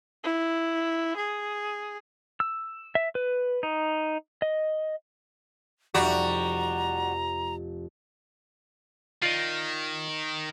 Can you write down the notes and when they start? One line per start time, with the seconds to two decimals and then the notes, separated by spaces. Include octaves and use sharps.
0.24 E4
1.17 G#4
2.40 E6
2.95 E5
3.15 B4
3.63 D#4
4.42 D#5
5.94 F1 F2 G3 F#4 A#5
9.22 D#3 F4 D5 D#5